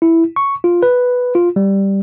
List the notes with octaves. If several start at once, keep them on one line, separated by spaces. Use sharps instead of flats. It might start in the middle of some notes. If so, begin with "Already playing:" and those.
E4
C#6
F4
B4
F4
G3